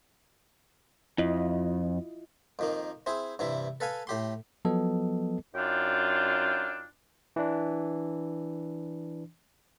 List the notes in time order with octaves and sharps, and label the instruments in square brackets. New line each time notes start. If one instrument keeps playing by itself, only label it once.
[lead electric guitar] F2 [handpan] E4 F4 D#5
[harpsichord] F2 D#3 A#3
C4 E4 G#4
G2 C3 E3 E4
A4 B4 F5 G#5
A2 G4 C6
[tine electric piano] F3 F#3 B3 A4 D#5
[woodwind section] F#2 D4 D#4 F4 G5
[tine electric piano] E3 D4